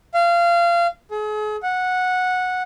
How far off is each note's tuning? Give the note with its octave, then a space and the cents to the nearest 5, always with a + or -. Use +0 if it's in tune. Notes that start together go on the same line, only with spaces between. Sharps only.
F5 -25
G#4 +40
F#5 -10